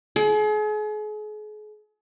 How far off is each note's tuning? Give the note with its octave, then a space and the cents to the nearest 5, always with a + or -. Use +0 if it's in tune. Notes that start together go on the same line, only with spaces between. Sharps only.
G#4 +40